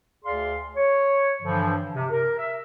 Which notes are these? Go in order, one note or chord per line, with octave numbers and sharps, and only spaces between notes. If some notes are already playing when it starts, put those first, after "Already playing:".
D2 G#4 D5 F5 C6
C#5
G2 D3 E3 F3
C3
A#4
E5